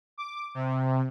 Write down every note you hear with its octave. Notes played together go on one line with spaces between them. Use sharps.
D6
C3